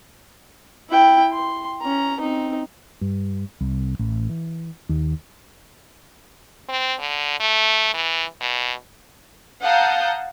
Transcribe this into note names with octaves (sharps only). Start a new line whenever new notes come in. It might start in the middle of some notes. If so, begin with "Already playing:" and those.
E4 G5
C6
C#4 A#5
C4 D#4
G2
C2
A1
E3
D#2
C4
D3
A3
E3
B2
F5 F#5 A5 A#5 D#6 G6